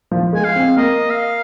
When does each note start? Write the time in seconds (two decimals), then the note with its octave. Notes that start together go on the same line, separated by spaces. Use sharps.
0.11 F3
0.33 G#3 G#5
0.44 F5
0.56 C4
0.77 A#3 D#5
1.10 F5